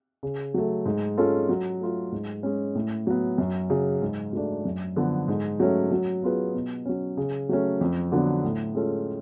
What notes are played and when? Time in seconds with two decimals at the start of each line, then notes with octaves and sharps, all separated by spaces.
0.23 C#3
0.54 F#3 A3
0.85 G#2
1.17 G#3 C#4 F4 A4
1.49 F#3
1.81 A3 F4
2.12 G#2
2.43 G#3 C#4
2.75 A2
3.07 F#3 B3
3.38 F#2
3.70 C#3 F#3
4.02 G#2
4.33 F#3 A3 D4
4.65 F#2
4.96 D3 F3 B3
5.28 G#2
5.60 F#3 A3 C#4
5.91 F#3
6.23 B3 F4 G#4 B4
6.54 B2
6.85 F#3 C#4
7.17 C#3
7.49 F#3 A3 C#4
7.81 F2
8.12 D3 F#3 B3 D4
8.44 A2
8.75 G#3 C#4 F4 A4